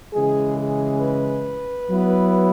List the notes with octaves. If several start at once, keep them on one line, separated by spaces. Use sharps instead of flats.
C#3 E3 G#3 G#4
G#4
B4
F#3 B3 E4